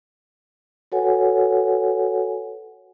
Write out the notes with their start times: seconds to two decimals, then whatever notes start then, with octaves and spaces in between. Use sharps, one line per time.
0.92 F#4 A4 B4 C#5 F#5 G#5